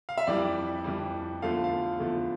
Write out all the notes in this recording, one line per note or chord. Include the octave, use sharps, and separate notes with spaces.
F5
E5
F2 E3 G3 D5
F2 E3 G3
E2 D3 F3 A3 F5
F5
E2 D3 F3 A3